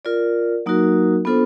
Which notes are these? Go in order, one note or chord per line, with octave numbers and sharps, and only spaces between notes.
F4 A#4 D5
F#3 A#3 D#4 F#4 A#4
B3 D4 F4 A4 C5